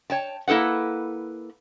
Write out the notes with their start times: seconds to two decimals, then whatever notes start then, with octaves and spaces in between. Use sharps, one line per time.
0.10 C#5 G5 A5
0.48 A#3 E4 A4 B4 F#5